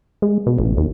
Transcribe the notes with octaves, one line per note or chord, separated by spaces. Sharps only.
G#3
B2
A1
D#2